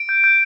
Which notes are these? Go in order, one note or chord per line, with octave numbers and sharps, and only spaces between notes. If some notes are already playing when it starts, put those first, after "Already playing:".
Already playing: D7
G6
G6